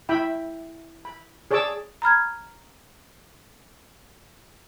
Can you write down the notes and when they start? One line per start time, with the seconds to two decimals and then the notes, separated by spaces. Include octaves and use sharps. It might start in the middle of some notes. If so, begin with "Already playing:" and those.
0.09 E4 E5 G5 B5
1.05 B5
1.51 G#4 C#5 D5 A5 D6 E6
2.02 A#5 B5 F6 G#6